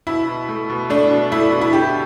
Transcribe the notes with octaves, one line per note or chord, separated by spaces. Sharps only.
B2 E4
B2
A3
B2
A3 D4
B2
A3 E4
B2
E4
D3 G4